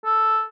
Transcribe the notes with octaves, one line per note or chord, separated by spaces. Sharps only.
A4